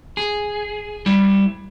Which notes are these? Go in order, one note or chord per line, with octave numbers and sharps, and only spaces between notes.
G#4
G3 E4